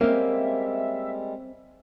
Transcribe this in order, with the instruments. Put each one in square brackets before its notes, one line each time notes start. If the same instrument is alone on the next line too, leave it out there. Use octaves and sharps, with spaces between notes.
[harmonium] G3 G#3 [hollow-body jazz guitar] A#3 [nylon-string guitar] C4 C#4 [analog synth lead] E5